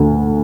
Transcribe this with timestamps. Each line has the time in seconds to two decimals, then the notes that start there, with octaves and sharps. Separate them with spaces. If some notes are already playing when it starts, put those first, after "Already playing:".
Already playing: D2 D3 A3